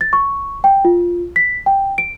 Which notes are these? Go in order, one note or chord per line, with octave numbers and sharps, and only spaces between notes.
A6
C#6
G5
F4
B6
G5
D7